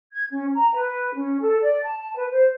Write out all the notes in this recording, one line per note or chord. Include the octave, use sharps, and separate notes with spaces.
G#6
C#4
A#5
B4
C#4
A4
D5
A5
B4
C5